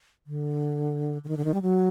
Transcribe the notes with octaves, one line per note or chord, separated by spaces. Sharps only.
D3
D3
D#3
D3
D#3
G3
F#3